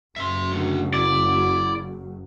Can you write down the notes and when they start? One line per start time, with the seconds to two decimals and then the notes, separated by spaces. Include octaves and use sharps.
0.16 F#1 F#2 E5 C6
0.52 A2 D3
0.94 E4 D5